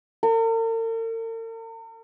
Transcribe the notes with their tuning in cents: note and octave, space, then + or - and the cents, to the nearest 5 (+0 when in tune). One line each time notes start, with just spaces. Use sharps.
A#4 -45